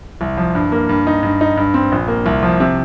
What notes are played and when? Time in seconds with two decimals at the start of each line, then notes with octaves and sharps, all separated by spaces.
0.21 C2
0.37 F3
0.55 G2
0.72 A#3
0.89 G2
1.07 D#4
1.23 G2
1.41 D#4
1.57 G2
1.74 C4
1.92 A#1
2.08 A#3
2.26 C2
2.43 F3
2.60 C3